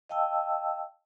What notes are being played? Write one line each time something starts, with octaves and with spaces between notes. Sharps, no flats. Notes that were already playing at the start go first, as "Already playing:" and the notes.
D#5 F5 G5 A5 E6